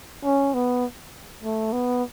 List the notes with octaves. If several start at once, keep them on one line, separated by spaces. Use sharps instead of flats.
C#4
B3
A3
B3